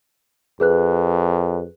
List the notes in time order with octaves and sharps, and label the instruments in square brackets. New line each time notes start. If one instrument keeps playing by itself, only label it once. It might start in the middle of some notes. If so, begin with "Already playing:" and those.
[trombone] F2 [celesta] G#4 B4 F#6